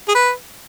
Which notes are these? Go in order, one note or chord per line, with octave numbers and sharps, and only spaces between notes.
G#4
B4